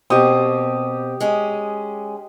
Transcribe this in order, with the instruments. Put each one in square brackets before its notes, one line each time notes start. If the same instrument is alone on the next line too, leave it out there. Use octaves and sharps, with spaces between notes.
[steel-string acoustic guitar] B2 A#3 C4 [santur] G4 D#6
[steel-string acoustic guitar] G#3 C#4